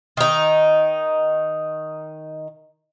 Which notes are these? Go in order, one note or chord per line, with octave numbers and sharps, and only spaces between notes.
D#3 D#4